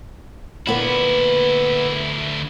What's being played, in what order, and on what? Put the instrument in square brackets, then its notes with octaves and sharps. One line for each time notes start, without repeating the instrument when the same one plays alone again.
[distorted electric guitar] D2 E4 [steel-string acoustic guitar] A#2 B3